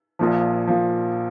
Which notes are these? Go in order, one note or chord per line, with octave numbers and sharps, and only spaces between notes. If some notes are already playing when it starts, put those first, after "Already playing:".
A#1 A#2 F3
A#2 F3